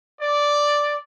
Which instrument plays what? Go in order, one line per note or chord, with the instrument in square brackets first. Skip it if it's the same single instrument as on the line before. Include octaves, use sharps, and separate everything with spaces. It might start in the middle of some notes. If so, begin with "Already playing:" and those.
[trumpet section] D5